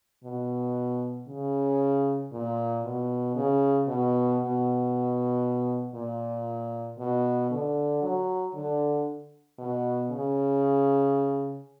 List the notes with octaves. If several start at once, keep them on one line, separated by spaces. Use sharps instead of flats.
B2
C#3
A#2
B2
C#3
B2
B2
A#2
B2
D3
F#3
D3
B2
C#3